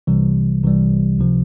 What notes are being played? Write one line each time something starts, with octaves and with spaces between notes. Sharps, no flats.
C2 C3 E3 G3
C2 C3 E3 G3
C#2 C3 F3